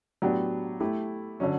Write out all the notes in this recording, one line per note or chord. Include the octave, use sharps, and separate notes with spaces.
A2 F#3 B3 D4 G4
A3 E4 G4
D3 F#3 C#4